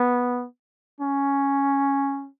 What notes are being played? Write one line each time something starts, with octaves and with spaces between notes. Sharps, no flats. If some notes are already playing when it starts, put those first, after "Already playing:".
Already playing: B3
C#4